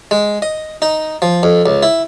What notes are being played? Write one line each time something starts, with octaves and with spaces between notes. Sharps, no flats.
G#3
D#5
D#4
F3
F2
C#2
E4